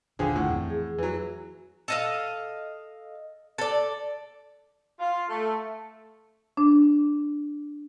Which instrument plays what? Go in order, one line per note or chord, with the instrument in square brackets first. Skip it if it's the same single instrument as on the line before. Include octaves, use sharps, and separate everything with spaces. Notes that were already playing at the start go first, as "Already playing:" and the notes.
[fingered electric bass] E1 A#1 D#3 [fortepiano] D3 F3 G#4 [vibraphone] G5
[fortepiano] A2 [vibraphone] F#5
[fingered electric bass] F2 E3 C4
[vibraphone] G#4
[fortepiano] E3 F#3
[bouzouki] A4 D#5 F5
A4 D5
[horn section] F4
A3
[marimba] D4